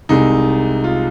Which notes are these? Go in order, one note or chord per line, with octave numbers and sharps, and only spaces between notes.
C2 C3 G#3 D#4
F4